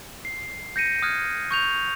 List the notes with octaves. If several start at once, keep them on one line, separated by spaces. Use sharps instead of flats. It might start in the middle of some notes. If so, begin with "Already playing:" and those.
C7
G6 A#6 C#7 D#7
D#6 F6 F#6 G#6
C#6 G6 F7